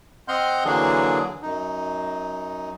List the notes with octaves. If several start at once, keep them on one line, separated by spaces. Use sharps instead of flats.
C4 D#5 F#5 C6 F6 G6
D3 E3 F#3 A#3 D4 G#4
F#2 D#4